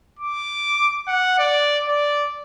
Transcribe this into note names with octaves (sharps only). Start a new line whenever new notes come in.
D6
F#5
D5
D5